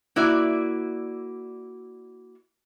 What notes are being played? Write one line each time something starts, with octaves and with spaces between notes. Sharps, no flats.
A#3 E4 F#4 D5